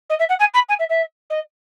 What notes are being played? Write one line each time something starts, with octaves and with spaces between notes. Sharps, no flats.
D#5
E5
F#5
G#5
B5
G#5
E5
E5
D#5